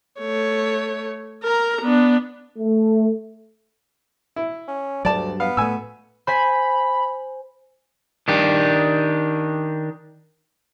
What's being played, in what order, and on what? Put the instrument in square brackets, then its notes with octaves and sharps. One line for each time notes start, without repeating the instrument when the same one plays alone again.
[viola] A3 C#5
A#4 A#5
B3 D4
[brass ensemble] A3
[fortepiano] E4
[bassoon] C#4
[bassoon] D2 [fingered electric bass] G2 F#3 [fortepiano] D5 A5
[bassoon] B3 [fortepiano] F5
[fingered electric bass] A2 A3 [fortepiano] G#5 E6
[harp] C5 G#5 B6 [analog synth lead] B5
[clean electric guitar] D#3 D4 G4